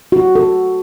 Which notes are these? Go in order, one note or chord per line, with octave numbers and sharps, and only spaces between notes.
F#4
A4